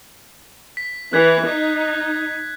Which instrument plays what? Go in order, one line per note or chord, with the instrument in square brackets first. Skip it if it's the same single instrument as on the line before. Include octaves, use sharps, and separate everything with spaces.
[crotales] B6
[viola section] E3 [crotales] F#6 G#6 B6
[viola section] D#4